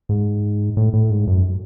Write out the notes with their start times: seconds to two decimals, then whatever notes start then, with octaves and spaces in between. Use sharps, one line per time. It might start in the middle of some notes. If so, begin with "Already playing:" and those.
0.09 G#2
0.77 A2
0.93 A2
1.10 G#2
1.27 F#2